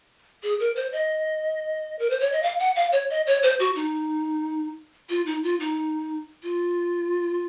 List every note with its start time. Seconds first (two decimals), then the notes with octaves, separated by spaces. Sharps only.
0.43 G#4
0.60 A#4
0.76 C5
0.93 D#5
1.99 A#4
2.10 C5
2.20 C#5
2.32 D#5
2.43 F5
2.59 F#5
2.76 F5
2.92 C#5
3.10 D#5
3.27 C#5
3.43 C5
3.60 F#4
3.76 D#4
5.10 F4
5.26 D#4
5.44 F4
5.60 D#4
6.43 F4